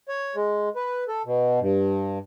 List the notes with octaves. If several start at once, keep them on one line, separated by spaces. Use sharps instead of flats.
C#5
G#3
B4
A4
B2
G2